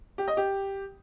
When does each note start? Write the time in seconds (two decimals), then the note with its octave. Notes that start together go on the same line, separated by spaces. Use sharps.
0.18 G4
0.28 D#5
0.37 G4